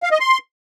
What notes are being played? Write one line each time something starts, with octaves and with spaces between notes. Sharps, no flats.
F5
D#5
C6